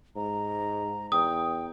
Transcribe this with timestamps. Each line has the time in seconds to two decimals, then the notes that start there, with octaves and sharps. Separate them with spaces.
0.16 G#2 A#5
1.12 E2 G5 D#6